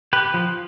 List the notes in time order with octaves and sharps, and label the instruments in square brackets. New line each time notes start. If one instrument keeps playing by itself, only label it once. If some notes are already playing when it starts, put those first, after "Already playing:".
[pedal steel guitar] G4 B4
F3